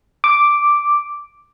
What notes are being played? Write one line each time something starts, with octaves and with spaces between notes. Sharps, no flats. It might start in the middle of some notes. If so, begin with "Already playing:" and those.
D6